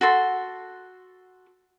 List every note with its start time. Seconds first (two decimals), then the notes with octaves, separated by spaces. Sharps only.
0.01 F#4 A4 C6